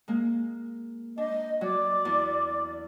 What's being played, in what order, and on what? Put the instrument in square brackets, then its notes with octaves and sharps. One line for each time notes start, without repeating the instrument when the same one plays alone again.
[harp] G#3 A#3
[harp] D4 [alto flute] D#5
[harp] F#3 [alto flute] D5
[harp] E2